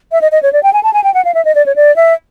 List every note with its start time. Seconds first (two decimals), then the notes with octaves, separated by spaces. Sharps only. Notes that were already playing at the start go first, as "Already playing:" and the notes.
0.12 E5
0.22 D#5
0.32 D#5
0.43 C#5
0.53 D5
0.63 G5
0.73 G#5
0.83 A5
0.94 G#5
1.04 G5
1.14 F#5
1.25 F5
1.34 E5
1.45 D#5
1.55 D5
1.66 C#5
1.76 D5
1.96 E5